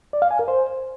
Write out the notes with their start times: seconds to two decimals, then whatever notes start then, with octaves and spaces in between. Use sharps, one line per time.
0.13 D5
0.22 F5
0.31 G#5
0.39 A#4
0.48 C5